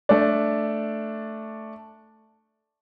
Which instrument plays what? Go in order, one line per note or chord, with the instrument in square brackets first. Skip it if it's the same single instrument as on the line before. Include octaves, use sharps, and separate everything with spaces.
[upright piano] A3 D4